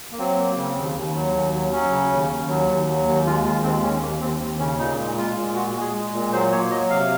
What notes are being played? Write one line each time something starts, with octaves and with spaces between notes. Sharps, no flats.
A#3
F#3 C4
A#3
C#3
D#2
D#2
F#3
D#2
F#3
F#3 C#4
C#3
D#2
D#2
F#3
D#2
F#3
D#2
G#3 F4
D#2 F4
G#3 C4
D#2 C#4
D#2 A#3
D#2 C4
D#2 C4
C#3 C#4
A#2 D#4
G#3
G#3 F4
A#2
G#3 F#4
G#3
G#4
G#3
A#2
F#3 C5
A#3 C#5
F#3 D#5
C3 F5